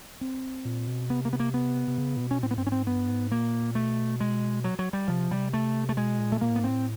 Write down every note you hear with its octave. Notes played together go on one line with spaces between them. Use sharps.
C4
A#2
B2
C3 B3
A#3
B3
A#3
B3
C3
C#3
A#2
B2
C#4
A2 C4
B3
G2 C4
G#2 C#4
C4
G2 B3
G#2
A#2 A#3
B2 A3
G#3
F#3
F#3
G3
C3 F3
C3 G3
A3
A3
B2 G#3
A#2
A3
A#2 A#3
A2
B3
G#2
A2 C4